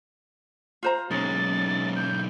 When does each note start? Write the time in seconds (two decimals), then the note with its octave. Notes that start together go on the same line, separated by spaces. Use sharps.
0.83 F4 C5 A#5
1.11 B1 F#3 G#3 A#3 C#4 D#4 A6
1.96 G6